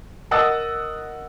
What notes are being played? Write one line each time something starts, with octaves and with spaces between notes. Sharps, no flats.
A#4 D#5 F#5 D#6 E6 A6